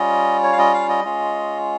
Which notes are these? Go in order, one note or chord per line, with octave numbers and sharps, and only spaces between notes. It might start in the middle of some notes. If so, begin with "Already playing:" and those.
Already playing: G3 C#4 F4 D#5
C#5
F5
D#5
F5
D#5
G#3 C#4 F4